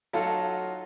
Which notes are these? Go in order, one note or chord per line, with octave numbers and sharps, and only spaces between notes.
F#3 D#4 F4 F#4 A4